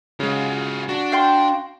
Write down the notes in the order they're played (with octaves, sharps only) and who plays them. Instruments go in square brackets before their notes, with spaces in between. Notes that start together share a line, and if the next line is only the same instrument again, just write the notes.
[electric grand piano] C#3 G#3 [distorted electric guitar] F4 F#4
[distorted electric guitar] D4 [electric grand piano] F#4
[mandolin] F5 G5 C6